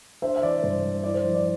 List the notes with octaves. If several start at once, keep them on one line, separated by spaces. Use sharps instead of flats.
D4 C5 E5
E5
E3 D5
G2 C5
G3
E4 D5
C5
F3
D5